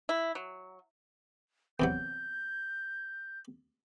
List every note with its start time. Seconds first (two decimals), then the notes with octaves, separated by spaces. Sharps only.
0.09 E4
0.35 F#3
1.80 E2 C3 F#3 G6